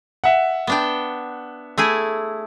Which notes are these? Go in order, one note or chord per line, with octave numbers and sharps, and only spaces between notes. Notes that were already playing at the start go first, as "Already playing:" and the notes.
E5 F#5
B3 D4 G5
A3 E4 G#4